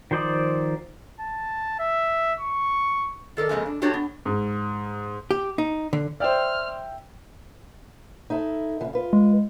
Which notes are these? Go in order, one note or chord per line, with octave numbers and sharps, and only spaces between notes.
D#3 F3 C5 D5 D#6
A5
E5
C#6
D#3 A4 A#4 D5
F2 C#3 G#3 A#3
D4
D4 F#4 G4 A4 C#5 A#5
B3
G#2
G4
D#4
D3
C5 D5 E5 G5 F6
D#4 E4 A4
C#3 E3
F4 B4
G#3